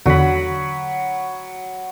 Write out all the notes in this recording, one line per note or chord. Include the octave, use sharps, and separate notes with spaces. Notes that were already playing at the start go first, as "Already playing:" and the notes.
E2 D3 F#3 B5